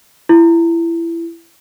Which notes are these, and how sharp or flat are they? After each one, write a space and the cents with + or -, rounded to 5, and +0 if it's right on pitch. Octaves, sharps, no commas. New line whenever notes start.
E4 +25